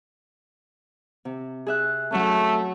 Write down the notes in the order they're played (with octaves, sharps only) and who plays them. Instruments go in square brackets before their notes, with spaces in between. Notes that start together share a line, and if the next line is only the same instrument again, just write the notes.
[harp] C3
G#4 E5 F#6
[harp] F#3 C#4 [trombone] A3